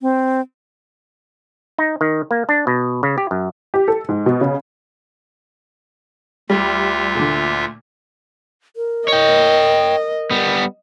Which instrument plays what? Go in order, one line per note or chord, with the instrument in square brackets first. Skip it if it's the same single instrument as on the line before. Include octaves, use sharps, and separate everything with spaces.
[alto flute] C4
[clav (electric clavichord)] D#4
D#3
A#3
D4
B2
C#3
G4
F#2
[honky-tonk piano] G4
A4
G#2
B2
C#3
[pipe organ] D2 F4 E5 [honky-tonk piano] G3
[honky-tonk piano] A#2 D3
[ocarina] A#4
[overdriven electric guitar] C#5 G5 [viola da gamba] D#5
[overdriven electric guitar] G3 B3